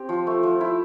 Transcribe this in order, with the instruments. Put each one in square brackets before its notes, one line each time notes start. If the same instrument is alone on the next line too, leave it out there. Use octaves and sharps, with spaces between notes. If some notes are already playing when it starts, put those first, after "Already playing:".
Already playing: [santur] C4 G4
F3
A3
F3
E4